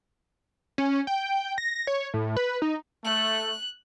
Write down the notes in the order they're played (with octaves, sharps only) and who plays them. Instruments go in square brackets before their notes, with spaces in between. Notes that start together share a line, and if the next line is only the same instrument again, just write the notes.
[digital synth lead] C#4
G5
A#6
C#5
A2
B4
D#4
[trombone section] A3 [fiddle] F#6